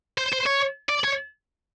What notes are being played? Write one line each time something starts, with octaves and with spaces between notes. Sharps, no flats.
C5
C5
C#5
D5
C#5